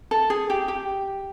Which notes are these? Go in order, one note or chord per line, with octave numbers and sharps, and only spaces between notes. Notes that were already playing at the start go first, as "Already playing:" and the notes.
A4
G#4
G4
G4